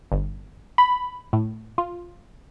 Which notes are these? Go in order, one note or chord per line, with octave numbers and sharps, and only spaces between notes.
G1
B5
A2
F4